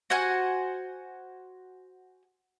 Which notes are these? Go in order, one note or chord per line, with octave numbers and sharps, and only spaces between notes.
F#4 C5 F#5 G#5